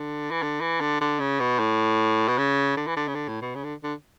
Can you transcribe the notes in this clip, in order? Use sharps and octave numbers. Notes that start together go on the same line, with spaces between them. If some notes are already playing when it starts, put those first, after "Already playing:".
Already playing: D3
E3
D3
E3
D3
D3
C#3
B2
A2
B2
C#3
D3
E3
D3
C#3
D3
A2
B2
C#3
D3
D3